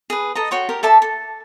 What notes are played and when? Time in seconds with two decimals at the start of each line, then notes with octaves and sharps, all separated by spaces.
0.10 G#4 B4
0.35 A4 D#5 A#5
0.51 F#4 C#5 G5 C6
0.69 G4 A#4 C#5
0.83 A4 E5 A5 D6
1.02 A4